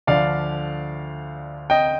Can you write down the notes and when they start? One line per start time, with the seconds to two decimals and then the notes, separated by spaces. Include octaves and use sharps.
0.07 D2 D3 F3 D5 F5
1.70 D#5 G5